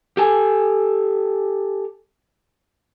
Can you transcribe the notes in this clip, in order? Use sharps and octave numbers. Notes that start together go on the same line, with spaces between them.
G4 A4 G#5